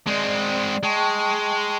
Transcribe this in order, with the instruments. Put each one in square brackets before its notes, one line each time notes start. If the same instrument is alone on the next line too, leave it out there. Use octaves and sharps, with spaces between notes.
[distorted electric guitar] G#3 C4 [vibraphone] D5
[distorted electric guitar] G#3 [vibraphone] G5 A5 C#6